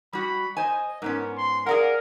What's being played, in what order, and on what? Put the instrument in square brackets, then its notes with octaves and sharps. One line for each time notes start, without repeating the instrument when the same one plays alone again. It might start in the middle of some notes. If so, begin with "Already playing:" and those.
[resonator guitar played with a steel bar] G3 F#4 [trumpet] B5
[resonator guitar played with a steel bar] C5 G#5 [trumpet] D#5
[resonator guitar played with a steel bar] G#2 B3 C#4 [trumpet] A#4
[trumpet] C6
[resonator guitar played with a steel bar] G#4 D5 F#5 [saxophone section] A#4 [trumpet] F5